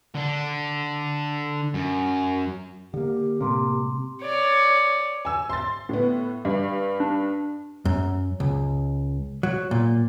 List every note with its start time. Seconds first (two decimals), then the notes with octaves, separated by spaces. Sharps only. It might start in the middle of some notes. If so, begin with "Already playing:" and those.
0.15 D3 D4
1.74 F#2
2.94 D3 A#3 G4
3.40 A2 C3 G#3 A#3
4.23 C#5 D5
5.25 G#5 E6
5.49 C6 A6
5.89 A2 B3
6.45 G2
7.00 D4
7.85 F#2
8.40 C#2
9.43 F#3
9.71 A#2